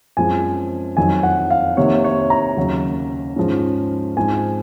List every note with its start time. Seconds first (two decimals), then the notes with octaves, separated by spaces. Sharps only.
0.17 F#2 F3 G#3 C4 G#5
0.97 F2 D#3 F#3 G#5
1.23 F#5
1.50 F5
1.77 C3 D#3 A#3 C#5
2.04 C#5
2.30 A#5
2.57 D#2 C#3 F#3 A#3
3.36 G#2 F3 G#3 C#4
4.17 G#2 F3 C4 G#5